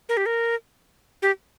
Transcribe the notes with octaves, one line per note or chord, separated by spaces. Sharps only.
A#4
G4
A#4
G4